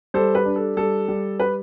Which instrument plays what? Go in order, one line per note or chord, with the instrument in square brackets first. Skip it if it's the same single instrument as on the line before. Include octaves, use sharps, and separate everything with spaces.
[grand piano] G3 [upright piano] A4 C5
[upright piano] B4
[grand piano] D4
[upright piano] A4
[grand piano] G3 [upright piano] A4
[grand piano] G3
[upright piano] B4